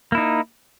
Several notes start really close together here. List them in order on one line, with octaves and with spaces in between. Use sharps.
A#3 E4 D#4